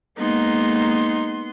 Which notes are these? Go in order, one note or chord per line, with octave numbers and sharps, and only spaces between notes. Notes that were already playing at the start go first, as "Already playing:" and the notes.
G#3 A#3 B3 D#4 C6